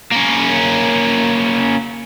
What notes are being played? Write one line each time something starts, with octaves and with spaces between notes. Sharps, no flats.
A#3 C#4